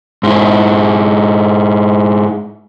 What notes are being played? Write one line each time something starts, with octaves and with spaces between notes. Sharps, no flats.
G#2 E4